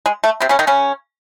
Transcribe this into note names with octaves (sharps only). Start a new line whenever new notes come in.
G#3
A3
C3 C4
C#3 C#4
D#3 D#4
C#3 C#4